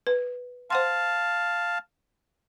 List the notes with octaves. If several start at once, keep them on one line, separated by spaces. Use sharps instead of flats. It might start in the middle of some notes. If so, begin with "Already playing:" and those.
B4
C5 F5 F#5 A5 C6